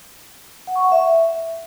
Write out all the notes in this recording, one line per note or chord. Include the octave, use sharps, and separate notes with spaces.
F#5
C#6
F#5
E5